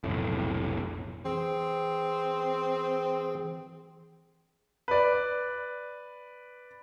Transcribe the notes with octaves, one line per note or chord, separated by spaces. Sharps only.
F1 B1 A2
E3 C4 G#4 G5
B4 D5